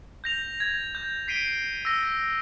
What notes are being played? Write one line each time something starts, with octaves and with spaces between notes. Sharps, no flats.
G6 A#6 F7
G#6
G6
B6 C7 D7 D#7 G7
E6 A#6